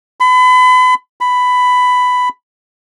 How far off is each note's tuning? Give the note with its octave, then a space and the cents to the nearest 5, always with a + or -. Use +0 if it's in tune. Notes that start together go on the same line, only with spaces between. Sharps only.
B5 +35
B5 +10